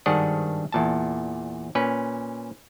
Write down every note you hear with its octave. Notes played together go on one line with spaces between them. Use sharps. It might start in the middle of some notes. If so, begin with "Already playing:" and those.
G#1 G2 D#3 D4 G#4 F#5
E2 A#2 A5
A#2 C#4 B4